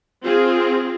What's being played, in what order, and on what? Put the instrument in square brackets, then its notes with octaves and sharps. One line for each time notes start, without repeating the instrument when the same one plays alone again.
[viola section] C4 F4 G#4